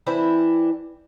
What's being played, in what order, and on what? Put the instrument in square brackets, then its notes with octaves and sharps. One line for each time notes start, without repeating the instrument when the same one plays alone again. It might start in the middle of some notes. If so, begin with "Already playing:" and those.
[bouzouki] E3 C4 D4 E4